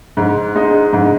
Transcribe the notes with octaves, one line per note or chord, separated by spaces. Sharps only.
G#2
G#3 D#4
G#2